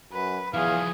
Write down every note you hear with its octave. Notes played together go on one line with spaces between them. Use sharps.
F#2 B4
E2 F3 E4 G#4 F5